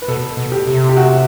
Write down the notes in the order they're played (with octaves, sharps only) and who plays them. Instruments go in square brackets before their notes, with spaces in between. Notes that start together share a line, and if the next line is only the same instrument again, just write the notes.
[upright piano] B4
[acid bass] B2 [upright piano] A4
[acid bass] B2
[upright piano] G4
[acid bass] C3
[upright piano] G4
F#4